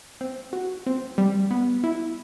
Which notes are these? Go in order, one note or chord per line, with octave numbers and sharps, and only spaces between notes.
C4
F#4
C4
G3
B3
E4